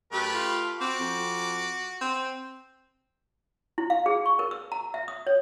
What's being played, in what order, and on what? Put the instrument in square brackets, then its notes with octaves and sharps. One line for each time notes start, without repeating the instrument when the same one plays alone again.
[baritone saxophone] F#2 [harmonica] A3 G4 B4
[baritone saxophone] F4
[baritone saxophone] C4 [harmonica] F#4 D6
[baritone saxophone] F2
C4
[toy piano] E4
F5
G#4
C#6
A#4
E6
A#5
E5
D#6
C#5